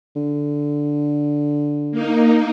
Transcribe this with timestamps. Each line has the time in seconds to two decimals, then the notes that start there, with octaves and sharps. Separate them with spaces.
0.16 D3
1.91 A#3 D#4